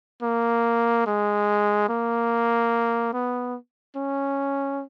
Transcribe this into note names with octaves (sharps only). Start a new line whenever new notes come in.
A#3
G#3
A#3
B3
C#4